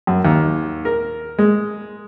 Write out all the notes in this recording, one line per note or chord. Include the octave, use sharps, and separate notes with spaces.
F#2
D#2
A#4
G#3